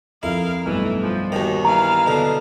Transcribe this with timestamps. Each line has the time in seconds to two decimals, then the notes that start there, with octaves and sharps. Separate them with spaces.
0.23 F2 E4 A#4 F5
0.66 B1 G2 E3 A3
1.02 F3
1.32 D#2 D#3 F#4
1.65 E3 F5 A#5
2.06 B2 D3